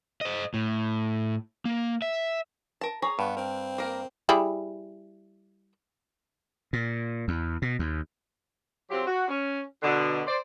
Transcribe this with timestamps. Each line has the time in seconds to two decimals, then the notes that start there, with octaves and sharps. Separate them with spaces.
0.21 C5 D#5
0.54 A2
1.65 A#3
2.02 E5
2.81 A#4 A5
3.02 G#4 C#5 A#5
3.19 G2 B3
3.37 C4 A#4
3.78 A#3 A#4
4.29 G3 E4 G#4
6.73 A#2
7.28 E2
7.62 B2
7.79 D#2
8.90 F#3 C4 F4 G4
9.07 F#4
9.28 C#4
9.82 B2 D3
10.27 C5 D5